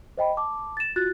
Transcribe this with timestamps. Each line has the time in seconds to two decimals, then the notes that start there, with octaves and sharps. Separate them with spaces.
0.17 C5 D#5 G5 B5
0.37 A5 D6
0.77 A6 E7
0.96 F4 F#4 F#6 A6